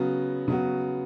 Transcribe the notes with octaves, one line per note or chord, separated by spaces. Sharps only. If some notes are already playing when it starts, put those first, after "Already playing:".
Already playing: C#3 F#3 B3 F#4
C#3 F#3 B3 F#4